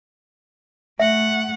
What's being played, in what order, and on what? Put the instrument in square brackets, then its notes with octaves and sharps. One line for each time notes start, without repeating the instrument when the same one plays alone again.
[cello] A3 F#5 [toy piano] E5